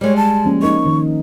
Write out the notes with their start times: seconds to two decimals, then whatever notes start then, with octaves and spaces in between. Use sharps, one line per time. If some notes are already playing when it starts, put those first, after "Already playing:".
0.01 G3 G#3 C#5
0.16 A5
0.45 F3 A#3 C#4
0.62 D#4 A#4 D#5 C#6
0.86 D#3